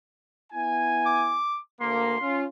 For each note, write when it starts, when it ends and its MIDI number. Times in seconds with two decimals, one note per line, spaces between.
0.52 1.38 59
0.52 1.38 64
0.52 1.38 80
1.06 1.57 86
1.81 2.15 38
1.81 2.15 58
1.81 2.40 84
2.20 2.45 61
2.20 2.45 65